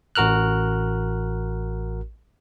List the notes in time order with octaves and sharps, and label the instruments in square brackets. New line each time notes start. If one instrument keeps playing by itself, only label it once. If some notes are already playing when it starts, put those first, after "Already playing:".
[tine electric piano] A1 F#4 A#4 F6 F#6